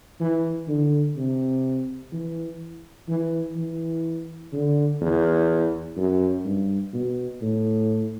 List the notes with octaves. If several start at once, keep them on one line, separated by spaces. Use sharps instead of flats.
E3
D3
C3
E3
E3
E3
D3
E2
F#2
G2
B2
A2